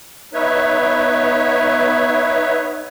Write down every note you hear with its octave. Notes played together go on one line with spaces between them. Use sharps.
B3 D#4 B4 C#5 E5